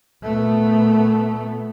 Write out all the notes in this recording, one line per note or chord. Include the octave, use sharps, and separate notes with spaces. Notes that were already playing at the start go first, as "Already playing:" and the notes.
A#2 A3 B3